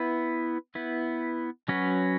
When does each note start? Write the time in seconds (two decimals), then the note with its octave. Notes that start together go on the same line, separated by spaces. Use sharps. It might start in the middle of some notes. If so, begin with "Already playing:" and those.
Already playing: B3 E4 B4
0.75 B3 E4 B4
1.68 F#3 C#4 F#4 B4